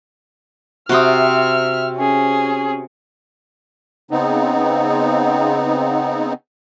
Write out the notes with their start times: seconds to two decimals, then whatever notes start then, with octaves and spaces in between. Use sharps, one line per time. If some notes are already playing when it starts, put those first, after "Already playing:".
0.89 C3 F#4 E5 G5 C6 D#6 F6
1.96 C#4 G#4
4.11 C#3 B3 C4 D#4